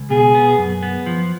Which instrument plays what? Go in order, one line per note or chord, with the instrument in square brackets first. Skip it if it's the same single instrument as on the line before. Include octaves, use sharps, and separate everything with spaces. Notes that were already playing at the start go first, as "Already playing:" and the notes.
Already playing: [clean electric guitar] C#2
[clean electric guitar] B2 [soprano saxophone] G#4
[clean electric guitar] B3
F#2
B3
F3